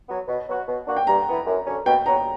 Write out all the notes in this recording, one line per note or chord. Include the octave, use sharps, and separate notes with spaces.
F#3 B3
B2
F#3 B3 F#4
B2
A#3 D4 F#4
G5
G2 A#5
E3 B3
F#2
D3 F#3 C#4
B2 G5
F#3 B3 A#5